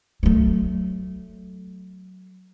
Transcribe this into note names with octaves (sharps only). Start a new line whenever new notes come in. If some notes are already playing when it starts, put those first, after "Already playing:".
F#3 A3